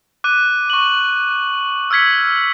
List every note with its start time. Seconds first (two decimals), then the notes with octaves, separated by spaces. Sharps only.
0.24 D6 F#6 D#7
0.70 C#6 F#7
1.91 E6 F6 G#6 B6 C#7